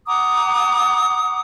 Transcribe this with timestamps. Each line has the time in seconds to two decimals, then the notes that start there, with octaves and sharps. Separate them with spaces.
0.07 F#5 A#5 D6 D#6